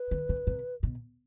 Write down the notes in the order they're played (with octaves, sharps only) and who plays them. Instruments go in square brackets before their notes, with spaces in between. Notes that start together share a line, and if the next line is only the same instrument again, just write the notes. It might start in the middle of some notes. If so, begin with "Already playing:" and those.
Already playing: [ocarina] B4
[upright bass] D3
C#3
C3
B2